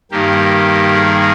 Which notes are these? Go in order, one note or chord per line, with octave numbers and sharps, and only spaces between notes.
G2 D#3 A#3 G4
G#4